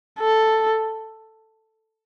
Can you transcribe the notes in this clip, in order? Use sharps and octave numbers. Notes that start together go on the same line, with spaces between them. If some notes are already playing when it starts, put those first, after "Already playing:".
A4